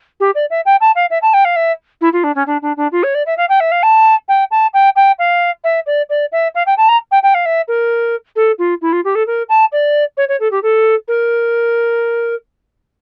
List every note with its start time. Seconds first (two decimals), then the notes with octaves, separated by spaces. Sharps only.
0.20 G4
0.35 D5
0.50 E5
0.66 G5
0.81 A5
0.95 F5
1.10 E5
1.22 A5
1.34 G5
1.45 F5
1.56 E5
2.01 E4
2.13 F4
2.24 D4
2.35 C#4
2.47 D4
2.62 D4
2.77 D4
2.92 F4
3.03 C#5
3.15 D5
3.26 E5
3.37 F5
3.49 G5
3.60 E5
3.72 F5
3.83 A5
4.28 G5
4.51 A5
4.74 G5
4.96 G5
5.19 F5
5.64 E5
5.86 D5
6.10 D5
6.32 E5
6.55 F5
6.66 G5
6.77 A5
6.89 A#5
7.11 G5
7.23 G5
7.34 F5
7.46 E5
7.68 A#4
8.36 A4
8.58 F4
8.82 E4
8.92 F4
9.04 G4
9.15 A4
9.27 A#4
9.49 A5
9.72 D5
10.17 C#5
10.29 C#5
10.40 A4
10.51 G4
10.63 A4
11.08 A#4